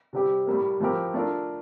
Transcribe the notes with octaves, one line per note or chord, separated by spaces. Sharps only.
C3 G3 C4 G4
A2 G3 A#3
A2 F3 C4 G4 A#4
A3 D4 F4 A#4